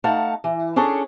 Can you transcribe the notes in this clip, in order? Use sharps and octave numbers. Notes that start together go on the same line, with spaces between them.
A3 D#4 F5 F#5 A5
E3
C#4 D4 G#4 A4 C#5